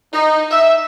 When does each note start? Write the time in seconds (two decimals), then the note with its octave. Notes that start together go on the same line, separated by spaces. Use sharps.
0.13 D#4
0.51 E5